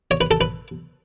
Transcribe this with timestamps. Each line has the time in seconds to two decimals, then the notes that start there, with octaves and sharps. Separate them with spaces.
0.11 C#5
0.21 B4
0.31 A4
0.41 B4